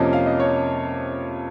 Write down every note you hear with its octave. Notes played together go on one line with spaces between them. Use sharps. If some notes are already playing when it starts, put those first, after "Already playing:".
Already playing: F2 C3 F3 A#3 C#4 D#5
F5
D#5
C#5